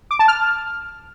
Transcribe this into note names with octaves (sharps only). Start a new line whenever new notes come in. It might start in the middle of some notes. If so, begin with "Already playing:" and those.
D6
A5
F6